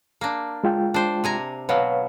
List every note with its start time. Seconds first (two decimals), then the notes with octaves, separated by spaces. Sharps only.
0.21 A#3 D4
0.64 G#3 F4 G5
0.94 D4 C5
1.24 C3 G#5 A#5
1.69 B2 F#3 B4 C#5 F5